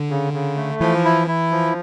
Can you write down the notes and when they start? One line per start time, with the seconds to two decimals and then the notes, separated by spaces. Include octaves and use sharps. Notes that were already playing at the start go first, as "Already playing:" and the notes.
Already playing: D3
0.10 C#3
0.33 C#3
0.57 A3
0.81 E3 F3
1.04 E4
1.28 E4
1.51 F3